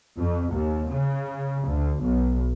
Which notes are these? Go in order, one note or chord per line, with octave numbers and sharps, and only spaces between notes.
F2
D#2
C#3
D2
B1